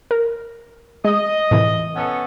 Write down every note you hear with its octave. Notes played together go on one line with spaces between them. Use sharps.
A#4
G#3 D#5
A2 C3 E3
B3 C#4 A4